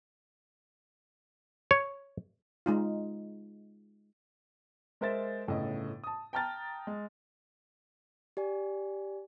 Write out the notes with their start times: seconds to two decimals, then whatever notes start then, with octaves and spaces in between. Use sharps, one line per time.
1.71 C#5
2.66 G#3 D#4 F4
5.01 G#3 A#4 C5 E5 A6
5.48 G1 A2 C#3 A4 D#5
6.04 A5 D#6
6.33 G5 A5 A#5 F6 A6
6.87 G#3
8.37 G4 D5 G#5